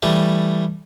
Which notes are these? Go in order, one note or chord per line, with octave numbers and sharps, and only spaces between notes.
E3 G3 A3